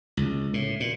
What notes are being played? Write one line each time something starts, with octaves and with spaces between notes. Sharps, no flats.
C#2
A2
A#2